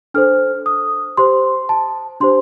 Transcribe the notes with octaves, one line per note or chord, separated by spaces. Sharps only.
D4 A4 C5 F6
D#6
G4 C5 C6
A5
D4 G4 C5 C6